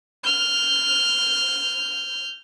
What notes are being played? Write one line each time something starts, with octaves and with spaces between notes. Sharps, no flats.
F6 G6